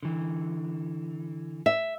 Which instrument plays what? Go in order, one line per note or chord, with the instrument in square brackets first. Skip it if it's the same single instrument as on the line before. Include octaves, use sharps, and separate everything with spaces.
[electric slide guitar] D3 E3
[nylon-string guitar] E5